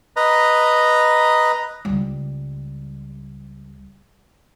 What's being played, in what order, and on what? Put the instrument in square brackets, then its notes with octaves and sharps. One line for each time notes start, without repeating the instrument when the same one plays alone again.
[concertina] B4 D#5 A#5
[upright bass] C#2 G3